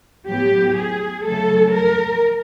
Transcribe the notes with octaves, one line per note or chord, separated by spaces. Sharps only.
A2 F#3 B3 G4
G#4
C#3 F#3 A3 A4
A#4